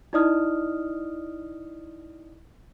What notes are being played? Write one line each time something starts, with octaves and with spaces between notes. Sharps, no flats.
D#4 E4 D5 D#5 D#6 F6